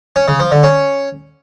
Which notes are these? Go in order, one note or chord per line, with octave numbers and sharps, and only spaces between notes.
C#4
C#3
F3
D3
C#4